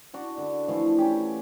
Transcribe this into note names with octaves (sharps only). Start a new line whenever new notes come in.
D4 F#4 D5
D3 A4
E3 F3 A3
C#4 G4